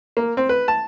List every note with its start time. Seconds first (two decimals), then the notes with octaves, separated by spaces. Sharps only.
0.17 A#3
0.37 C4
0.49 B4
0.68 A5